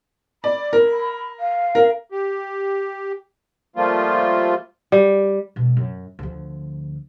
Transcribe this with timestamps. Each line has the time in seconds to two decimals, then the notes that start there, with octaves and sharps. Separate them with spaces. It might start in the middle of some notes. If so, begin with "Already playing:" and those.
0.44 D5 B5
0.73 A#4
1.40 F5
1.75 A#4
2.12 G4
3.76 F3 G3 A3 A#3 F4
4.92 G3
5.56 E1 B2
5.77 F#2
6.19 D2 F3